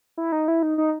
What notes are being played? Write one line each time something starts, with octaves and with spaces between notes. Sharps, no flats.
E4
D#4
E4
D#4
D#4